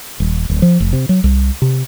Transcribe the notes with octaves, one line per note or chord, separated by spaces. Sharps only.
D#1
D1
F3
F1
C3
F#3
C2
C3